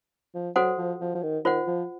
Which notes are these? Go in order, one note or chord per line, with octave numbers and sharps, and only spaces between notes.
F3
F#3 F#4 A4 C5 F#5
F3
F3
F3
D#3
D#3 F4 C5 F#5
F3